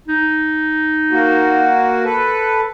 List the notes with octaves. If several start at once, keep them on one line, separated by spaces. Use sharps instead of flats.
D#4
A#3 F#4
A4 B4